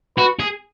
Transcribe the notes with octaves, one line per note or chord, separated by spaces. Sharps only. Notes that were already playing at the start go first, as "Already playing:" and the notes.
F#4 B4
G#4